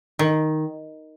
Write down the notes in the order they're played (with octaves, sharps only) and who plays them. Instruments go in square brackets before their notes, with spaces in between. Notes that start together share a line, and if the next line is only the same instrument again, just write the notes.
[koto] D#3